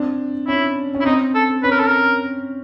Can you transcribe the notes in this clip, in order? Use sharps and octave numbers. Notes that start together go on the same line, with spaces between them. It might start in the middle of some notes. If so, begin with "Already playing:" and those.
Already playing: C4 D4
C#4 E4
C#4
E4
C4 D#4
A4
C#4 B4
A#4
A4
A#4